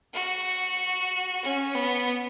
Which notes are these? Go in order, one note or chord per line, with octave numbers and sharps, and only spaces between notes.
F#4
C#4
B3